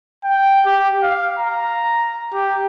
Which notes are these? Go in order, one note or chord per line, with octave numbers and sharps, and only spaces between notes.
G5
G4
F5
A#5
G4